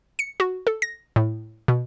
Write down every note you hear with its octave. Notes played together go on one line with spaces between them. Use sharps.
C#7
F#4
A4
A#6
A2
B2